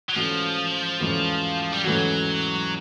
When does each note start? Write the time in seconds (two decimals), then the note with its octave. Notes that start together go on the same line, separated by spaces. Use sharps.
0.09 F#3
0.15 G#2 E3 F3 A3 C#4 F#4
1.00 G#2 E3 A3 C#4 F#4
1.73 G3
1.84 G#2 E3 F#3 A3 C#4 F#4